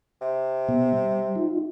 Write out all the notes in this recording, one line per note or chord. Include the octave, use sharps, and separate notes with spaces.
C3
B2 B3
G3
D#4 F4